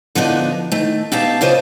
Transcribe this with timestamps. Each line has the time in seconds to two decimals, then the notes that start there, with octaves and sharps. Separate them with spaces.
0.15 D3 F3 B3 D4 D#4
0.72 D#3 A3
1.12 B2 D#4 G4 E5 F5 A5
1.41 C#3 D4 F4 C5 D#5